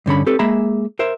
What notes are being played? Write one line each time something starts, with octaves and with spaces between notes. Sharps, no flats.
G2 D3 C#4 B5
C4 G4 A4 B4
G#3 A#3 G#4 E5 A#5 B5
A#4 C5 E5